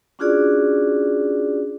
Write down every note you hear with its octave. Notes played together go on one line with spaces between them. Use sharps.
C#4 D4 F4 F#4 G#4 D5